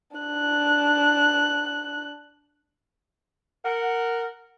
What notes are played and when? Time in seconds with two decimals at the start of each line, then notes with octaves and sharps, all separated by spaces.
0.17 D4 F#6
3.64 A#4 F#5